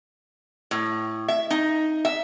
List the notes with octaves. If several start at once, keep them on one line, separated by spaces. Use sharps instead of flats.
A2
E5
D#4
E5